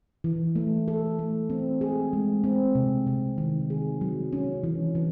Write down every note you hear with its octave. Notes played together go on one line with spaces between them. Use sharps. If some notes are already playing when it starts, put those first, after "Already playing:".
E3
A3
A4
A3
C4
G#4
G#3
C4
C3
C3
D#3
G#4
F#3
C#4
E3
E3